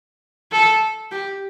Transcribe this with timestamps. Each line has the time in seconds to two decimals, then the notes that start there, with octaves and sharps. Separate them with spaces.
0.52 A4
1.11 G4